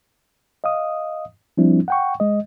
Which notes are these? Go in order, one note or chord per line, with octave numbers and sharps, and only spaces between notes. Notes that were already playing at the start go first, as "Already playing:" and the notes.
D#5 F5 D#6
F3 G3 C4 D4 E4
F#5 G5 C#6
G#3 D#5